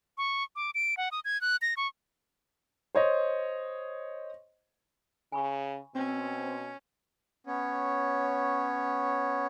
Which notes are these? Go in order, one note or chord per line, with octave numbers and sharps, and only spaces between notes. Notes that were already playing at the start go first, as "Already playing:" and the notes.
C#6
D6
D7
F#5
D#6
G#6
F#6
A#6
C#6
C5 C#5 D#5
C#3 G#5 B5 C#6
B2 C4 C#4
B3 C#4 C#5